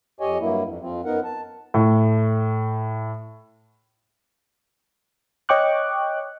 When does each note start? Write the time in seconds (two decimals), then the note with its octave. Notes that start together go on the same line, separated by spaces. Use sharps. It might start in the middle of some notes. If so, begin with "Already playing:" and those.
0.20 F2 G4 C#5 D#5 G#5
0.40 G2 F#3 A#3 E4
0.65 F2
0.81 F2 F3 C4
1.05 F#2 B3 D#4 A#4 F#5
1.24 A5
1.74 A2 C#6
5.49 C#5 D#5 G5 C#6 D6 F#6